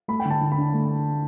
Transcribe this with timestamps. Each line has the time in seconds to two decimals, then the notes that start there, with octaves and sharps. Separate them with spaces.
0.08 A3 B5
0.20 G5
0.25 D3
0.30 A5
0.41 D3
0.52 B5
0.58 D4
0.74 A3